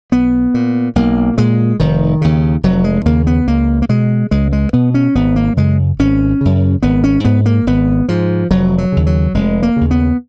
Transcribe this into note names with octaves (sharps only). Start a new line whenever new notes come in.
B1 B3
A#2
B1 A#3
A#2 G#3
F1 D#3
D#2 C#3
F1 F#3
G#3
D#2 C#3 A#3
B3
C#2 A#3
A#3
B2 G#3
C#2 G#3
G#3
B2 B3
C#4
G#1 B3
A#3
F#2 C#3 G#3
G#1 C#4
F#2 C#3
G#1 B3
C#4
G#2 B3
A#3
G#1 B3
G#2 F3
F1 F#3
F#3
D#2 C#3
F#3
F1 G#3
A#3
D#2 C#3
B3